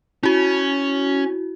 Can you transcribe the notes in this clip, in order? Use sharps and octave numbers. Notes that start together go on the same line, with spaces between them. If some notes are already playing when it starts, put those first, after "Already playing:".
C#4 E4 F#4